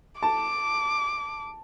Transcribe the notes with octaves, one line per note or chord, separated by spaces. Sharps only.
A5 D6